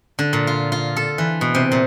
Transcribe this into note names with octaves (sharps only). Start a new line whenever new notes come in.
D3
A#2
F4
F4
A4
E3
B2
C3
A#2